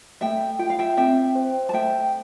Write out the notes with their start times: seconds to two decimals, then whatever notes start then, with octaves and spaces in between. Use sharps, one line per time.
0.21 A3 E5 G5
0.59 F4 G5
0.70 F5
0.79 E5 G5
0.97 C4 E5 G5
1.35 C5
1.69 A5
1.74 A3 E5 G5